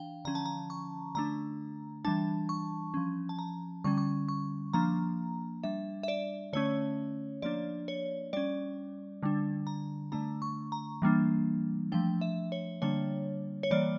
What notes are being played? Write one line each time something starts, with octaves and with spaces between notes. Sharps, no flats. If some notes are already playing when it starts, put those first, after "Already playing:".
Already playing: E3 D4 F5 G5
D3 F3 C#4 A#5
A5
A#5
C#6
D3 A3 D4 A#5
E3 G3 D4 A5
C#6
F3 C#4
A5
A#5
D3 G3 C#4 C#6
C#6
C#6
F3 A#3 D4 A#5
G3 D4 E5
E5
D5
D3 A3 C#4 C#5
F3 A#3 D4 D5
C#5
G3 C#4 D5
D3 G3 D4
A#5
D3 A3 D4 A#5
C#6
A#5
E3 G3 A#3 D4
F3 A3 D4 G5
E5
C#5
D3 G3 A#3 D4 C#5
C#5
E3 G3 A#3 D5